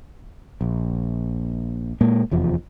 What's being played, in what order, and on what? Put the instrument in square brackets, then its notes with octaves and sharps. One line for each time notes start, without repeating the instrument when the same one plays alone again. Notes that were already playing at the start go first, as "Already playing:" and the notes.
[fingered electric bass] A#1
A#2 G#3 A#3
F1 E2 F3